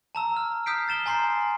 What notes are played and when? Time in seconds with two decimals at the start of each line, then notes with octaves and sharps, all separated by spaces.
0.15 A5 A#5 E6
0.37 F6
0.66 D#6 F6 G6 B6 C7 D7
0.87 G6 A6 E7 G7
1.06 G#5 A#5 C6 G6 C7